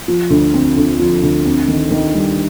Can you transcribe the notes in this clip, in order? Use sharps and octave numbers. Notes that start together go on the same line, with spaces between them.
F3
D2
C4
D3
F3
D2
C4
D#3
D#3
G3